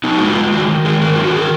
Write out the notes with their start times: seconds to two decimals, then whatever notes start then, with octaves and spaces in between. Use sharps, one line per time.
0.04 B3 D#4
0.18 G#3 F#4
0.29 F4
0.36 G#3
0.52 D#3 F#4
0.68 D#3
0.85 G#3 G#4
1.01 D#3 A#4
1.16 F#3 F4
1.24 F#4
1.32 D#3 G#4
1.41 A#4